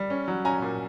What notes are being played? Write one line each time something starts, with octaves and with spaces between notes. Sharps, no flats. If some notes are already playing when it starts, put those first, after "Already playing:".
Already playing: G3
C#4
F#3
C#4 G#5 A#5
A#2